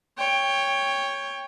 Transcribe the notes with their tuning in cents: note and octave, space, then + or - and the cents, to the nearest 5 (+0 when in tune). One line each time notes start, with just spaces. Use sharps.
C#5 +0 G5 +20